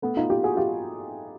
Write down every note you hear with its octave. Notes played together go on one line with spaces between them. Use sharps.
A3 B3
D#4 F4
F4 G4
F#4 G#4
F4 G4